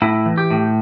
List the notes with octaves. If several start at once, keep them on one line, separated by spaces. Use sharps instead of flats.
A2 E4
E3
G4
A2